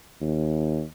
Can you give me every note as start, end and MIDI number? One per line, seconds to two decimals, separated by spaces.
0.21 0.83 39